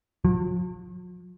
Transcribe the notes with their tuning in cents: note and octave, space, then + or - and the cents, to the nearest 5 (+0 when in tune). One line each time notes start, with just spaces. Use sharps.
F3 +45